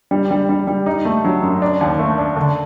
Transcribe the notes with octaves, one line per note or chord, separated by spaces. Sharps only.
G3
G3
G3
G3
D#4
A3
F#3
F#2
D4
D#2
A3
D4
D3